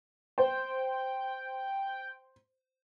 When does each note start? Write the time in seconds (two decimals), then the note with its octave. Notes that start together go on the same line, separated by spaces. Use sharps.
0.38 C5 G5